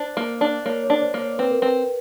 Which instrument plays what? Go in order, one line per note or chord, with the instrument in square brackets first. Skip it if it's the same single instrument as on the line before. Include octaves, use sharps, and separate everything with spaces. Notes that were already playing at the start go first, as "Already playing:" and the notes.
Already playing: [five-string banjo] D4 [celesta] C5
[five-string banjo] A#3
D4
[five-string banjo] A#3 [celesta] C#5
[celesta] C#5
[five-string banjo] D4
[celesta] C5 D5
[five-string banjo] A#3
[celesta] C#5
[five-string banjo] C4 [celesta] B4
[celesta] A#4
[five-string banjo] C4 [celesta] B4